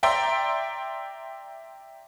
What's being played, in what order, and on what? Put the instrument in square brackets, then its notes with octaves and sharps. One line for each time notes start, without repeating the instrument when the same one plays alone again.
[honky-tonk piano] D5 E5 G5 A#5 C6